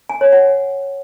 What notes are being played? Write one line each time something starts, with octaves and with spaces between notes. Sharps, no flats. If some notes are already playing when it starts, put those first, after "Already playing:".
G#5
C#5
F#5